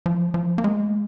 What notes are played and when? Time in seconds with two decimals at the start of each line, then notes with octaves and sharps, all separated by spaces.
0.06 F3
0.34 F3
0.58 A#3
0.64 G#3